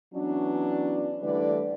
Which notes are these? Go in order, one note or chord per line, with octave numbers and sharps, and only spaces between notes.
E3 F#3 B3 C#4 D4
D3 E3 G3 A3 B4 D5